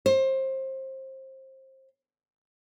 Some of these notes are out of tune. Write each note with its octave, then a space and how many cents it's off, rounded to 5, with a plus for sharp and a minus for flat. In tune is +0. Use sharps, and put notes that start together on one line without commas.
C5 +25